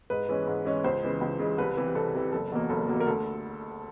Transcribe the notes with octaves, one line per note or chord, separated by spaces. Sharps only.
G#2 B4
E3 G#3 C#4
G#2
E3 G#3 C#4
C#2 C5
C#3 E3 G#3
C#2
C#3 E3 G#3
C2 B4
C3 E3
C2 A4
C3 E3
F#1 A4
E2 B2 F#3 A#3
F#1 A4
E2 B2 F#3 A#3
A#4
D2 A4